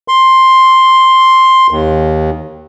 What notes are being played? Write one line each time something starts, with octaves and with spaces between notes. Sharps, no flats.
C6
D#2